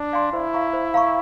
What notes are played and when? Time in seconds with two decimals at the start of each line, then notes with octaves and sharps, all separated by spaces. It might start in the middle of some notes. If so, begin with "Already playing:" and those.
Already playing: D4
0.13 D5 F5 G#5 C6
0.33 E4 C5
0.53 F5 A#5 C#6
0.73 C5
0.94 F5 A#5 C#6